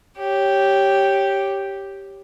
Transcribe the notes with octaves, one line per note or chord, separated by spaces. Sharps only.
G4 C#5